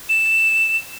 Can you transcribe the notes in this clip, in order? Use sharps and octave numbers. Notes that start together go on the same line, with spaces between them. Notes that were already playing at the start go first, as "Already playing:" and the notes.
E7